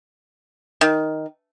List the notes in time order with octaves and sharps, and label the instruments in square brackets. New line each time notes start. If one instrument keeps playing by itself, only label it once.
[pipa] D#3